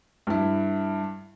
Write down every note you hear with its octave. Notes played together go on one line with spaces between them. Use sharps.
G2 E4